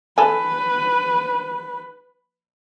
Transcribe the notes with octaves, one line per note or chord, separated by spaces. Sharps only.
A4 B4 G#5